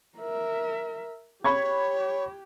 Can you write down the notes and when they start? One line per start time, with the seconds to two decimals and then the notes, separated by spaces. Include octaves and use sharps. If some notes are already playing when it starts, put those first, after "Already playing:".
0.18 A#4 E5
1.44 G4 C#5 B5 C#6 G#6